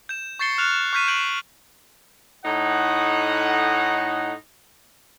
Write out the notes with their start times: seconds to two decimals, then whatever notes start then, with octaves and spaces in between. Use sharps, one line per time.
0.09 G6 E7
0.39 C#6 G6 A6 C7 C#7 G7
0.58 F6 F#6 F7
0.93 C#6 F6 G6 B6 D#7
1.08 G6 D7 F#7
2.45 A2 D#4 F#5